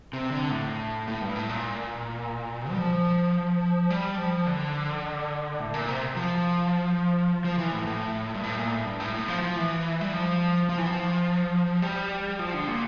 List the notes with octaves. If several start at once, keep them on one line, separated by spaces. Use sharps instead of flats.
C3
D3
A2
A2
G2
A2
A#2
G3
F3
G3
F3
D3
A2
A#2
C3
F3
F3
E3
A2
A2
G2
A2
A#2
A2
G2
A2
A2
F3
F3
E3
G3
F3
F3
E3
F3
G3
F3
D3
A#2